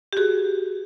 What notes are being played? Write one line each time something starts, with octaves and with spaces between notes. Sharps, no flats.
G4
F#4 G#4